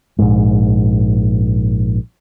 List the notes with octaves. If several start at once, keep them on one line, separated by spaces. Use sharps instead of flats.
A#1 G#2